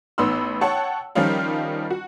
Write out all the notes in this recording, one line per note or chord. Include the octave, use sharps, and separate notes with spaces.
A1 B3 D#4 B5 C6 E6
C#5 F#5 G5 A5 C#6
D#3 F3 G3 C#4 D#4 F4
F#4